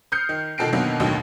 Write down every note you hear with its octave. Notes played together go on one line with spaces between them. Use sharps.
D#6 F6 G6 C7 C#7
D#3
B2 D#3 A4 F#5 C7 D7
B2 D3 D#3 F#3 A#3 B3
A1 D#2 B2 D3 D#3 F#3